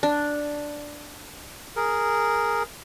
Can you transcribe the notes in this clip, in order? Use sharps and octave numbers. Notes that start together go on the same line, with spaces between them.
D4
G#4 A#4